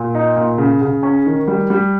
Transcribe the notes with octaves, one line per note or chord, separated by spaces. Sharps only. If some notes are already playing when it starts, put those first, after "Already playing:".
Already playing: A#2
D#4
A#2
C#3
C#3
C#4
D#3
G3
G3